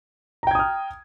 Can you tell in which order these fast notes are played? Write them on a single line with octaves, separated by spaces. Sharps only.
A#5 G5 G#6 D#6 F6